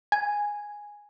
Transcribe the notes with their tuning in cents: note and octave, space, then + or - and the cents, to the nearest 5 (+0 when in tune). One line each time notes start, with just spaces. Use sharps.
G#5 -5